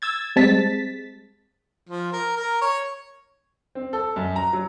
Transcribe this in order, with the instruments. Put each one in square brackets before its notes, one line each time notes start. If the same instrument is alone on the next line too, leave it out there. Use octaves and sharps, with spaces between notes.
[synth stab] E6 G#6 A6
G3 G#3 C4 A5 A6 B6
[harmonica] F3
A#4
A#4
C#5
[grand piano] C4
A4
F#2
A#5
F#3